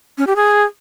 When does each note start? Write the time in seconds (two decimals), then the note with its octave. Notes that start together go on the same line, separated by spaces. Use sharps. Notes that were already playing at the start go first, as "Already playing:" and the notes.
0.18 C#4
0.27 G4
0.36 G#4